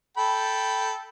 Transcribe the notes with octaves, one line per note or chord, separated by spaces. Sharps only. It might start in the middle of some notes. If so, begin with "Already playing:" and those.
A4 G5 B5